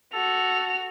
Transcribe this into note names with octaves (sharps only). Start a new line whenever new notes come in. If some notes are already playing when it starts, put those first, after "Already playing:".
F#4 A4 F7